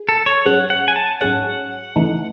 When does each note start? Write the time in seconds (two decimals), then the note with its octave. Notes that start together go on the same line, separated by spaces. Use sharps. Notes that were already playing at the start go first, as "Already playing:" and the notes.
Already playing: G#4
0.09 A4
0.26 C#5
0.45 G#2 F#3 C#4 G#4 C#5 F#5
0.70 F#5
0.88 G#5
0.96 A5
1.21 G#2 F#3 C#4 G#4 C#5 F#5
1.96 C#3 E3 A3 D#4